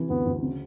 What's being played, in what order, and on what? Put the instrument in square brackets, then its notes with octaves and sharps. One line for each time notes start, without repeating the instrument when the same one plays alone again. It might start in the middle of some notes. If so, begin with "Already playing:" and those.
Already playing: [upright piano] C3 E3
[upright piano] D2 [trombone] B3
[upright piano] D2
C#3